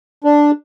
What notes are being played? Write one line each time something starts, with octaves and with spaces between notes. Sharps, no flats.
D4